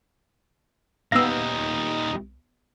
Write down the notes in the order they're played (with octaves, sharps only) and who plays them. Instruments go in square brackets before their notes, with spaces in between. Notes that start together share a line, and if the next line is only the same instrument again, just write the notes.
[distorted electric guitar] D#2 G3 [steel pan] B3 F5 [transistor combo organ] D#4 [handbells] E6 A#6